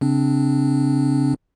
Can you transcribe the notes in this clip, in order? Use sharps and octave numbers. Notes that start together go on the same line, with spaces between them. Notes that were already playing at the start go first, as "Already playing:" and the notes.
C#3 C4 D4